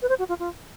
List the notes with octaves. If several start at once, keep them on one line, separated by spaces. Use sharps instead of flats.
B4
C5
F#4
F4
F4